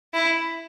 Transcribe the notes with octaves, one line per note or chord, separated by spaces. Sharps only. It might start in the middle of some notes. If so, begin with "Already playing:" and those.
E4